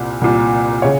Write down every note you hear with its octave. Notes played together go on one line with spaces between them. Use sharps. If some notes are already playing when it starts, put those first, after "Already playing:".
Already playing: C2 A#2
C2 A#2
C#3 C#5